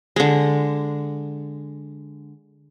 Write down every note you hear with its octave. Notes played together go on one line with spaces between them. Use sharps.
D3 G#3